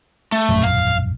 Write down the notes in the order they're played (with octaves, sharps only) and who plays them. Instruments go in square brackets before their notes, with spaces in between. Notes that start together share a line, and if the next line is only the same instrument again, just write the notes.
[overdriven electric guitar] A3
[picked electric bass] E1 A#1 F#2
[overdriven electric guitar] F5